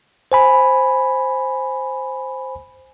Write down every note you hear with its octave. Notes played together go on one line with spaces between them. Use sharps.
C5 G#5 B5